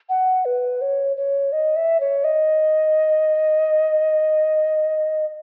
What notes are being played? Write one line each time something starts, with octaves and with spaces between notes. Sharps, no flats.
F#5
B4
C#5
C#5
D#5
E5
C#5
D#5